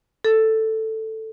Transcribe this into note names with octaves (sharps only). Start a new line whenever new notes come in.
A4